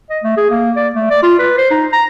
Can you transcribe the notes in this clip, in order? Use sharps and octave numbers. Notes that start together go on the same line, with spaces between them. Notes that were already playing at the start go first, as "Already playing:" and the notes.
D#5
A3
G#4
A#3
D5
A3
D5
F4
B4
C5
D#4
A#5